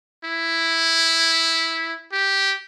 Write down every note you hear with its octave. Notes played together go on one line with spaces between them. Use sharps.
E4
G4